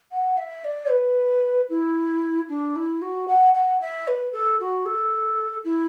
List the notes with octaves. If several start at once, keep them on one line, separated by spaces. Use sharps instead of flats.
F#5
E5
D5
B4
E4
D4
E4
F#4
F#5
F#5
E5
B4
A4
F#4
A4
E4